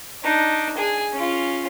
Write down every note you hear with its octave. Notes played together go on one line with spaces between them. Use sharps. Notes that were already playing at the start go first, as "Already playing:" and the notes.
D4 D#4
G#4 G#5
C#4 F4